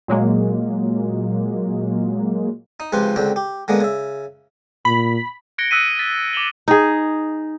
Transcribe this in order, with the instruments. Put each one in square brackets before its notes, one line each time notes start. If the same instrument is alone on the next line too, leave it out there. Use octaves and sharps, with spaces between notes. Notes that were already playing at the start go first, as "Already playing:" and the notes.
[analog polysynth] A#2 F#3 G#3 A#3
[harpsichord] D#4
C#2 C3 F3 B4 C5
C#2 D3 C4 G5
G4
D3 G#3 A#3 B3
C#3 E5
[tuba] A#2 [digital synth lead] B5
[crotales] F#6 G#6 A#6 C#7 D7 G7
D#6 E6 F#6 B6 D#7
A6 B6
D6 G#6 E7 F#7 G7
[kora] D#4 G#4